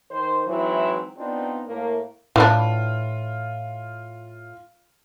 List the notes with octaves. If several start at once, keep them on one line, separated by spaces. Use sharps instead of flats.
D#3 C5
G#2 E3 F#3 C4 E4
B3 C4 D4 D#4 F4
A2 A3 A#3
A2 E3 D4 F4